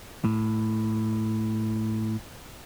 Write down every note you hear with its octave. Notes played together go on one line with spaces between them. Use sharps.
A2